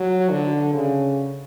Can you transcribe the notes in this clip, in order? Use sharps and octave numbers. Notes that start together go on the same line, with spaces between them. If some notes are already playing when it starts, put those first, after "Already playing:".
Already playing: F#3
D3
C#3